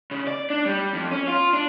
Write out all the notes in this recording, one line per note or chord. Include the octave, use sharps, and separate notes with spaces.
C#3
D5
D4
G3
F2
C#4
F4
D4